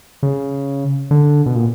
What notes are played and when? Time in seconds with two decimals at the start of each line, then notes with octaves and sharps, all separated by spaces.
0.23 C#3
1.11 D3
1.46 B2
1.55 A#2